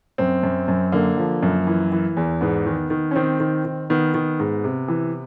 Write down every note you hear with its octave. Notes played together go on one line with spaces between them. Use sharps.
F#2 C4
F#2
F#2
D3 A#3
F3
F#2
E3
E3
E2
G#2 B3
D#3
D#3
C#4
D#3 C4
D#3
D#3
D#3 B3
D#3
G#2
C3
E3